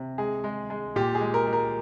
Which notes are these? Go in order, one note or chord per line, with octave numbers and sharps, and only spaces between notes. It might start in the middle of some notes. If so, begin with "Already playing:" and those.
Already playing: C3
G#3 G#4
G#3
G#3
A#2 G4
G#4
G#3
A#4
G#3
A#4